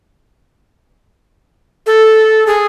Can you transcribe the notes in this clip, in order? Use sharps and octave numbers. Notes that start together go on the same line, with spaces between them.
A4
G#4